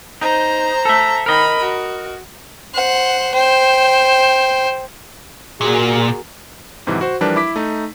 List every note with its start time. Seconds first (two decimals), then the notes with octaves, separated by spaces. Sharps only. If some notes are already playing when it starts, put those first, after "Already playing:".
0.21 D#4 C5 A#5
0.85 A4 E5
1.26 A#4 D#5 B5
1.60 F#4
2.74 C5 F#5
3.34 C5 G5
5.61 A#2 F#4 G#4 A#4
6.87 F2 G#2 C3 E3 F#3
7.01 F#4 C5
7.21 E3 F3 G3 D4 A#4 B4
7.36 E4 D6 B6
7.56 A3 D#4